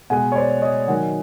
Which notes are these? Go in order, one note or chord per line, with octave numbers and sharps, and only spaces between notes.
B2 G#3 F#5 G#5
C#5
C5 D5
C#5 D#5
D#3 F#3 A#3 F#5 G#5